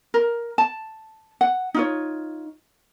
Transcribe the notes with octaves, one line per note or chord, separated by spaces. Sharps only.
A#4
A5
F#5
D#4 F4 C#5